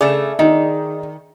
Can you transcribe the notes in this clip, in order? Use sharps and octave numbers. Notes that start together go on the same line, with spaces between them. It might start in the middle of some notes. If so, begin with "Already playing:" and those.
C#3 A3 G#4 D5
D#3 D#4